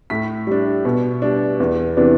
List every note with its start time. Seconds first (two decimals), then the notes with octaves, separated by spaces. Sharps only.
0.10 A2 B6
0.47 G3 D4
0.85 B2
1.22 G3 D4
1.60 E2
1.97 C3 E3 B3 D4